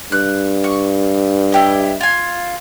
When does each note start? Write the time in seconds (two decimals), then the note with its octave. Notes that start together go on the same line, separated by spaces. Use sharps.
0.12 G2 F#6
0.64 C#6
1.52 E4 G4 D#5
2.01 F4 G#5